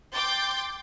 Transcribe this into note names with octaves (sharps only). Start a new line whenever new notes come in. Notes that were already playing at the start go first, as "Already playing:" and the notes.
G5 C6 D6 G6 A6